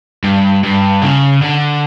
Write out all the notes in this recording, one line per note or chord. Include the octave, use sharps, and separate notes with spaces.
G2
G2
C#3
D3